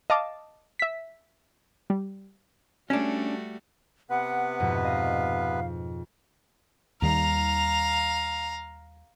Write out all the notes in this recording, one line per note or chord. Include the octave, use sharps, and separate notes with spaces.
D#5 F5 A5 D6
E5 B6
G3
G3 A3 C#4 D4 F#4
C3 B3 B4 F#5
F2 G#2 B2
D#5 F5
D#2 D#3 G3 F5 A#5